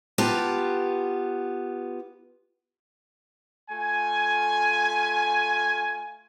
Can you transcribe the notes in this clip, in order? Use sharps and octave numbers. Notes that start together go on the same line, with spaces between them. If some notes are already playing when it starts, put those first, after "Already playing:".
B3 F4 G4 B4 A5 A#5
A3 F4 G#5